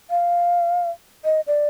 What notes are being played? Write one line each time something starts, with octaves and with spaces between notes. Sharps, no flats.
F5
D#5
D5